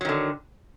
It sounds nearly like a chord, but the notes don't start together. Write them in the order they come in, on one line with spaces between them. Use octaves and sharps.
F#3 D#3 D3